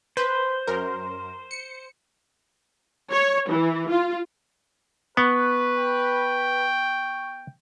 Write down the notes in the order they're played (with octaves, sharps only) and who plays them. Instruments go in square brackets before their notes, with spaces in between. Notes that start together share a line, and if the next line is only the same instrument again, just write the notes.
[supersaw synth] B4 [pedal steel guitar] C5
[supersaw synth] F#2 A#4
C#7
[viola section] C#5
E3
F4
[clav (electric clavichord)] B3 [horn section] B4 [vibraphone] C#6
[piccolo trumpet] G5